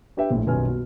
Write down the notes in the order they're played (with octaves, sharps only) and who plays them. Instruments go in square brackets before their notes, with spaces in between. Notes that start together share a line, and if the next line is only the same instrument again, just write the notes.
[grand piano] D4 G4 B4 E5 G5
A#1 A2
D#1 B1 F#2 B4 G#5 F6
B2